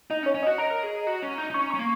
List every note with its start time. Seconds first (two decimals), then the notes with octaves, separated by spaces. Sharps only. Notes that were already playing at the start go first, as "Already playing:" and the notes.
0.10 D#4 D#5
0.23 C#4
0.26 C#5
0.34 C#4
0.43 F#4 D#5
0.58 A#4 A#5
0.71 A#4
0.83 G#4
1.07 F#4
1.23 C#4
1.38 D#4
1.50 D#4
1.54 C#4 C#6
1.71 C#4 C#6
1.79 A#3